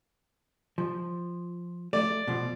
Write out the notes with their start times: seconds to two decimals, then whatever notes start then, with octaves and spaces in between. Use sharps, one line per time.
0.78 F3
1.93 A3 D5
2.28 B2 F3